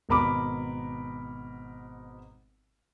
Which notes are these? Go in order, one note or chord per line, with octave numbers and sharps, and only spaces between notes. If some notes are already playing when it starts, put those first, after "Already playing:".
G#1 B2 A#4 B5 D6